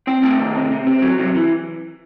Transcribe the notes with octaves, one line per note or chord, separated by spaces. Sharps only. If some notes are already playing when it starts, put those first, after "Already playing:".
C4 G5
A3 G5
D#3
C3
C3
C4
F#3
C3
E3